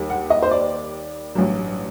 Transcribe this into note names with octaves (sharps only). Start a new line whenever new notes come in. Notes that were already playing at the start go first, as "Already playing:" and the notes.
Already playing: D#2 D#3 G3
F#5
D#5
C5
D5
A1 G2 F#3